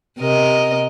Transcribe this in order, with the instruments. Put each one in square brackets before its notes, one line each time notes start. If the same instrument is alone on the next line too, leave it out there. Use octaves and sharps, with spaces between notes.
[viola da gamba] C3 A#4 D#5